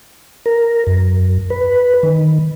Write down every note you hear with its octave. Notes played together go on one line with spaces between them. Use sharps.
A#4
F#2
B4
D#3